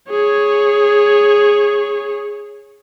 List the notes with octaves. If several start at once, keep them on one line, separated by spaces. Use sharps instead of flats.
G#4 C#5